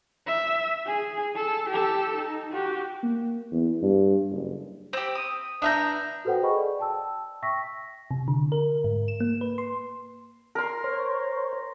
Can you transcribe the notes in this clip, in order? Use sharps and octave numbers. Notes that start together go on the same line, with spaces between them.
E5
G#4
A4
G4 A4
D#4
F#4 G4
A#3
E2
G2
F#1
C4 G4
D#6
B3 D4 E5 A#5 F#6 G6
F#4 A4 B4 C5 F#5 G5
G#4 D#5 G5 G#5 B5 C#6
D5
G5 A5 E6
E5 G5 C#6 E6 A#6 B6
C3
D3
A#4
G#2
E7
A#3
B4
C6
A#4 C6
C5 C#5